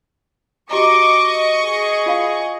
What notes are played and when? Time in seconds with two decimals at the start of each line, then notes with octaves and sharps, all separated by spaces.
0.71 F#4 G4 D#5 A#5 C#6 D6 C#7
1.61 G#4
2.06 F4 F5